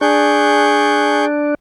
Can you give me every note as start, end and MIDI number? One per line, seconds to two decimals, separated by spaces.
0.01 1.55 62
0.01 1.25 68
0.01 1.25 85
0.01 1.25 91